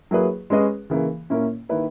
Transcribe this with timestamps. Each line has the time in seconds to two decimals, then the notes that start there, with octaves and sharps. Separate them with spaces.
0.11 F#3 A#3 E4 G#4 B4
0.50 G#3 C#4 G#4 B4 D#5
0.90 C#3 E3 A#3
1.30 A#2 A#3 C#4 E4
1.69 D#3 A#3 E4 B4